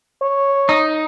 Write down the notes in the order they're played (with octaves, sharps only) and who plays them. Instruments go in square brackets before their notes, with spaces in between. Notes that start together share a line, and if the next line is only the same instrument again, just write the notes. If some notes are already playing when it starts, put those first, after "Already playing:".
[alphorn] C#5
[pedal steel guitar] D#4